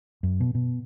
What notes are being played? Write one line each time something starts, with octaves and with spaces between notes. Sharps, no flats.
F#2
B2
B2